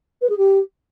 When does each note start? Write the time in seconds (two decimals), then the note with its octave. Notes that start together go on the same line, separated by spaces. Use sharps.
0.21 B4
0.29 G#4
0.37 G4